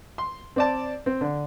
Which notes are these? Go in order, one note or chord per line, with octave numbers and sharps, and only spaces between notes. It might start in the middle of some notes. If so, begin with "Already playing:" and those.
C6
C4 D5 A5
C4
D3